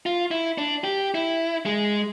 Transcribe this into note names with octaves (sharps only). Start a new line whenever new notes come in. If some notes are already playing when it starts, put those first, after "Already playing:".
F4
E4
D4
G4
E4
G#3